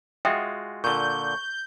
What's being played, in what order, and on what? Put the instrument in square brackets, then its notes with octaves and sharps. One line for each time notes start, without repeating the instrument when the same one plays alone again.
[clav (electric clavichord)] G#3 F4 F#4 [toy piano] E5 G5 D#6
[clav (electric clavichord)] A#2 D3 [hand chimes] C#6 [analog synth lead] G6